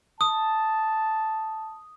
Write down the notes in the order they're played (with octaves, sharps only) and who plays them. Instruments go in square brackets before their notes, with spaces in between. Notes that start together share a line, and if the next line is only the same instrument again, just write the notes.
[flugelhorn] A5 [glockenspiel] D#6